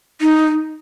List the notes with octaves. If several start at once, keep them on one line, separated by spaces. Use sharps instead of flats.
D#4